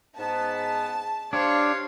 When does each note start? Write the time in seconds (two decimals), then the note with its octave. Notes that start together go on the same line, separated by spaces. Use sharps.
0.18 G#2 B3 A5
1.33 D4 G4 C5 C#5 F5